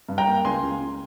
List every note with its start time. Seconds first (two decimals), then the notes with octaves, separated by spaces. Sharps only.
0.09 G2
0.18 G5 A#5
0.27 A#3
0.44 C#2 G#5 C6
0.63 C#2
0.80 C#2